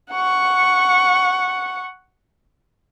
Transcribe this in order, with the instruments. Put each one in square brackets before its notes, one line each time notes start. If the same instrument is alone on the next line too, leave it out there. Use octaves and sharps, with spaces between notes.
[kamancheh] F#5 C#6